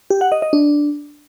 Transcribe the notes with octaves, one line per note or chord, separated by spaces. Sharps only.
G4
F#5
D#5
D#5
D4